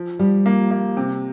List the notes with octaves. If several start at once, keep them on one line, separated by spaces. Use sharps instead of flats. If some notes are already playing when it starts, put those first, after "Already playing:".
Already playing: F3
F3 G3
A#3
A#3
C3